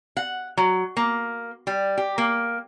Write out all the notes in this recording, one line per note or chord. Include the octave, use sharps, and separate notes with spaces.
F#5
F#3
A#3
G3
G4
A#3